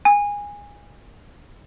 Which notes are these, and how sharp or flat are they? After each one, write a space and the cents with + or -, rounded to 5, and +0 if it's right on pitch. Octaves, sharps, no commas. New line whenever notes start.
G#5 -20